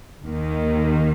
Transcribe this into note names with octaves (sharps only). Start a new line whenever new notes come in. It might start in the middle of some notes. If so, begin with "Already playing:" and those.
D#2 D#3 A#3